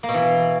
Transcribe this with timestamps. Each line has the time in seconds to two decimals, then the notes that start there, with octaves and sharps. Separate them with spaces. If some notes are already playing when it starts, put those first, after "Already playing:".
0.03 A#3
0.09 B2
0.14 E3